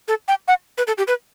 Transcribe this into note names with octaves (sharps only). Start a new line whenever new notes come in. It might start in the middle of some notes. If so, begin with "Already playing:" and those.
A4
G5
F#5
B4
A4
G4
B4